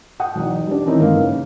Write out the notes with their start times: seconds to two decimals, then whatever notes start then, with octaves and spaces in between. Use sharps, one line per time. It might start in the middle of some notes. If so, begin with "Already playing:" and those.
0.20 F#5 G5 D#6
0.35 B1 E2 D#4
0.67 G3 D4
0.86 D#3 E3 C4 C#4 D#4 E4
0.99 G1 G#2 A#3 A#4 F5
1.22 C#3